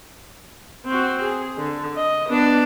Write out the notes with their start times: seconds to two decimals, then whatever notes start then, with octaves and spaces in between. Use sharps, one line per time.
0.86 C4 F#4
1.22 G#4
1.57 D3
1.96 D#5
2.29 B3 D4